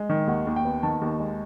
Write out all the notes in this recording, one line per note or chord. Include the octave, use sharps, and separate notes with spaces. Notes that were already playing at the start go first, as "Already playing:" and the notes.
Already playing: G#3
D#3
D#2 F#5
D#2
G5
B3
D#3 A5
D#2
G#3